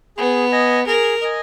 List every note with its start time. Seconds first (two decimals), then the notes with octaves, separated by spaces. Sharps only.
0.17 B3 G#4
0.52 D#5 G#5
0.86 G#4 A#4
1.22 D#5 G#5